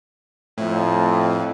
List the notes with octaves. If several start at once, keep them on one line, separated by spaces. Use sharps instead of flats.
F2 A2